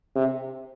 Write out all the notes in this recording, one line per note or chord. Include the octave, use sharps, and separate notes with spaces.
C3